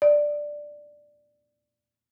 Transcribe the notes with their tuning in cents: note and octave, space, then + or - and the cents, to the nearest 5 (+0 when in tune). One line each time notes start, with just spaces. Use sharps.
D5 +5